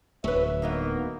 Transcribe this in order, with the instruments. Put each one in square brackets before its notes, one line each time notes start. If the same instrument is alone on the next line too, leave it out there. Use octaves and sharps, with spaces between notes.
[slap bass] D1 D2 [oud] B4 C#5 [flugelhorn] E5
[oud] F#3 B3 D#4 [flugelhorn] A#3